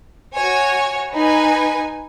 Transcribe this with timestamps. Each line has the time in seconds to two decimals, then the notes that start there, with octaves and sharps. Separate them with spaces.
0.34 F#4 C#5 G#5
1.13 D#4 B4 G#5